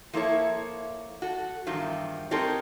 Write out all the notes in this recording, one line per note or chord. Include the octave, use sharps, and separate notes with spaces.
F3 A#3 E4 A4 C#5
F#4 A4
E2 G2 D#3 F3
C4 D#4 G4 A4 A#4 C#5